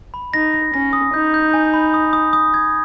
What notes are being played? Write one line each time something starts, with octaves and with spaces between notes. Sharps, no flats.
B5
D#4 A#6
A#6
C#4 A#6
D#6
D#4 G6
G6
G#5
B5
D#6
D#6
D#6
G#6